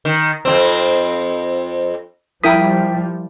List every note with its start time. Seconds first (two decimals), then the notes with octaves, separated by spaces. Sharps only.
0.05 D#3
0.45 F2 A#2 C4
2.44 F3 G3 E4 A#4 G5 D#6 B6